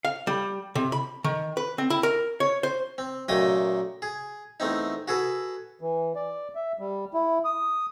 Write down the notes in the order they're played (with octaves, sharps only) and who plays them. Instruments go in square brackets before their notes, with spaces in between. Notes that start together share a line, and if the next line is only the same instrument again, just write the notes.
[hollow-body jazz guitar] F5
G3
C3
B5
D#3
B4
C4
E4
A#4
C#5
C5
[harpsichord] C4
F#2 A#2 A3 D#5 G5 D#6
G#4
E2 A3 C4 D#4
F#4 G#4 A4 B4
[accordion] E3
D5
E5
G3
E4
D#6